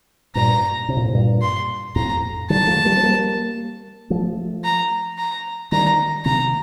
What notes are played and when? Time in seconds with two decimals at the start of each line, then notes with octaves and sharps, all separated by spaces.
0.35 G2 A#2 A#5
0.88 C3
0.97 A#2
1.05 A2
1.14 G2 A#2
1.42 C6
1.96 F2 A2 A#5
2.50 D#3 G3 A5
2.67 F3 A3
2.85 G3 A#3
2.97 C4
3.03 G3 A#3
4.10 F3 A3
4.64 A#5
5.18 A#5
5.72 D#3 G3 A#5
6.25 C3 D#3 A#5